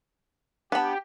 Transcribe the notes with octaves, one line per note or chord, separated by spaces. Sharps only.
B3 D4 G4 F#5 A5 B5